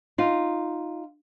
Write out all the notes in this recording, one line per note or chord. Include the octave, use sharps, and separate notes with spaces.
D#4 F4